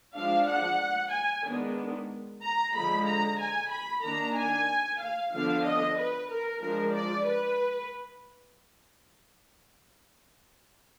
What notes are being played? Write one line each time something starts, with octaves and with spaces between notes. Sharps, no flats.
F3 G#3 D4 F5
F#5
G#5
D#3 G#3 B3 D4
A#5
D3 F3 G#3 B5
A#5
G#5
B5
D#3 A#3 D4 A#5
G#5
F5
D3 F3 B3 D4 F5
D#5
B4
A#4
F3 G#3 D4 A#4
D5
B4